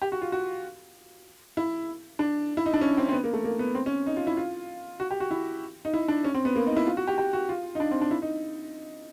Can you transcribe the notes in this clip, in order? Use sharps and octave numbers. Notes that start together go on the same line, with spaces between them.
G4
F#4
F4
F#4
E4
D4
E4
D#4
D4
C#4
C4
C4
B3
A#3
A3
A#3
B3
C4
C#4
D#4
F4
E4
F4
F#4
G4
F#4
E4
D#4
E4
D4
C#4
C4
B3
A#3
D#4
E4
F4
F#4
G4
G4
F#4
F4
D#4
D4
C4
D4
E4
D#4